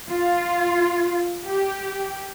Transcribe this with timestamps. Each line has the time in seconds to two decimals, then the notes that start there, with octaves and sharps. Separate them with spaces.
0.10 F4
1.46 G4